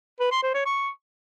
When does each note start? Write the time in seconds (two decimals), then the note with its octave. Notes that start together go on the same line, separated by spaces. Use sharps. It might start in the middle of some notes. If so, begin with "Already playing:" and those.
0.20 B4
0.31 C6
0.43 C5
0.54 C#5
0.66 C#6